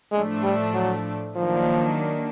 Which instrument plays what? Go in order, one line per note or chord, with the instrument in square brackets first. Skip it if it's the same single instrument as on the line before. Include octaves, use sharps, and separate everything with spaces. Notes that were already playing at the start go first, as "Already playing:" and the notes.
[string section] A2 F3 A3 D4 [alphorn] G#3
[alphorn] G3
F#3
[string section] D#3 F#3 A#3 D4 [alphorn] F3